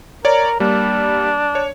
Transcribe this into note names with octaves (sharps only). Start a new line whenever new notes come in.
A#4 C#5 D5
G3 A#3 D4
C#5